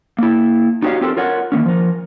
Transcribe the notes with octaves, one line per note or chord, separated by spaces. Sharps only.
A#3 E4
D#4 F#4 G4 A#4 C#5 F5
C4 F4 G4 A4 A#4
F4 A#4 C#5 F#5
D#3 A#3 C#4
F3 A#4